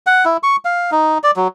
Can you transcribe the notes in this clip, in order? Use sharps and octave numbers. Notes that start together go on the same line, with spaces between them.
F#5
E4
C#6
F5
D#4
D5
F#3